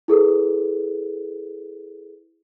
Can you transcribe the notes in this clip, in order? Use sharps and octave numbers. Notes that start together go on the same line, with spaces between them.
E4 G#4 A4 B4